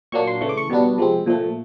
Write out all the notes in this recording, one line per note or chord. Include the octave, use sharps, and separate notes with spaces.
A#2 F#3 A#3 D4 C#6
C6
C#3 E3 A3 C#6
D6
C#6
B2 G3 B3 D4
C3 F3 G#3 C4
A#2 F3 A3